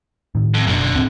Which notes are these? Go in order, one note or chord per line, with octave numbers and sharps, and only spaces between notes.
A2 D#3
F2
F#1 F#2 B2 D3
D1 C#2 C4